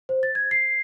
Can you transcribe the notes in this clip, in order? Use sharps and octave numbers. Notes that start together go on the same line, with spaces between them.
C5
A6
G#6
C7